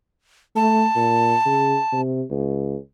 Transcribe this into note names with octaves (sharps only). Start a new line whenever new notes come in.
A3 A5
A#2
C#3
C3
C#2